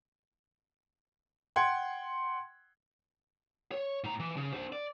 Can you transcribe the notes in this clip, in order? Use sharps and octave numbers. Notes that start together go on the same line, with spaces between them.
F#5 G5 C6 G#6
C#5
A2 A#5
E3
C#3
D4 C5
D5